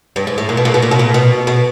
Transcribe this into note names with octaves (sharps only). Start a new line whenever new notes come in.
G2
G#2
A2
A#2
B2
A#2
B2
A#2
B2
A#2
B2
B2